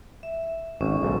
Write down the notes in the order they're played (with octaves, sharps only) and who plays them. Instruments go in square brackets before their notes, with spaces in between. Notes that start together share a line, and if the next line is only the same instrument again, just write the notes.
[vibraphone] E5
[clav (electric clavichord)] G#1 [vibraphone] C#4
[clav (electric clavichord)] B1 G#2